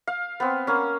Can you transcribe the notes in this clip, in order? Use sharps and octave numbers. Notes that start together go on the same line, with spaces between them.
F5
B3 C4
A#3 C#4